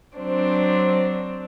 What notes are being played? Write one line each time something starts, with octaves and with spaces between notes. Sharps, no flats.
F#3 C4 D4 C5